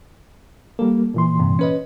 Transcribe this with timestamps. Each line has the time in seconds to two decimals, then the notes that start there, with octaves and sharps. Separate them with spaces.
0.79 G3 A#3 A4
1.14 A#2 E3 C6
1.39 G2 C3
1.59 C#4 B4 D#5